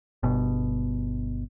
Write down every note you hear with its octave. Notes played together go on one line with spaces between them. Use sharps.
G1 B2